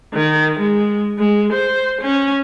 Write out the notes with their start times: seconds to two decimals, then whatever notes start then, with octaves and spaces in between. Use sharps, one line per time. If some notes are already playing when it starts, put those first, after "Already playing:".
0.13 D#3
0.59 G#3
1.18 G#3
1.52 C5
2.01 C#4